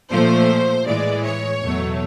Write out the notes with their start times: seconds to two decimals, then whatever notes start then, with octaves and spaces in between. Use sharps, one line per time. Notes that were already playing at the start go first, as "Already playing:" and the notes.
0.10 A#2 F3 A3 C5
0.85 A2 E3 G#3 D5
1.23 C#5
1.61 E2 B2 F#3 A3